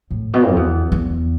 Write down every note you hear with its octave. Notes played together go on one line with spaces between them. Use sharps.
A2
B2
F2
E2
E2